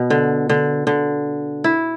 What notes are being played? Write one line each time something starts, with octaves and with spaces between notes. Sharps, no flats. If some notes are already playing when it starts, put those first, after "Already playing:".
Already playing: B2 B3
D3
D3
D3
E4